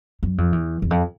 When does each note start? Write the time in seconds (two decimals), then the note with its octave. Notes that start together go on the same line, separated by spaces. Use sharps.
0.23 F#2
0.38 F2
0.52 E2
0.82 E2
0.91 F2